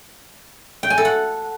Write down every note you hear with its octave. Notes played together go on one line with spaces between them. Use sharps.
G5
G#5
A4
F#5